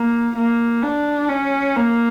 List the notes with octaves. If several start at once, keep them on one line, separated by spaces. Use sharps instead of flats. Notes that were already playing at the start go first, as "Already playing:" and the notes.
Already playing: A#3
A#3
D4
C#4
A#3